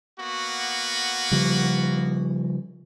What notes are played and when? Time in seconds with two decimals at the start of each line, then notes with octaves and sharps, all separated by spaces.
0.17 A#3 B3 F#4
1.32 C#3 F3 G3